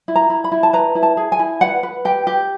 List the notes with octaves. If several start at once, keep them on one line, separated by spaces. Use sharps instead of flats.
E4
A#5
E4
B5
E4
A5
B4 A#5
E4
A5
G#4
G#5
E4
B4 F#5
B4
G4 G5
G4